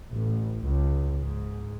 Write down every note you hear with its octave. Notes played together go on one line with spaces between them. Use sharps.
A1
C#2
G#2